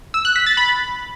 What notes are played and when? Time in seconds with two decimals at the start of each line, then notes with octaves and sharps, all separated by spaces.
0.14 E6
0.25 F#6
0.36 B6
0.46 A6
0.57 B5